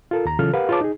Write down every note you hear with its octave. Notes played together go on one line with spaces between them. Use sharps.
F4 A4 A#4
D#2 A#5
C#3 E3 F#3 F4 A4 F6
G4 A#4 B4 F5 F#5
F4 G#4 B4 C#5 A5 D6
D#4 G#4